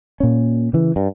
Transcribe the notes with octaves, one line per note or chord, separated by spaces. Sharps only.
A#2 C#4
C#3 E3
G2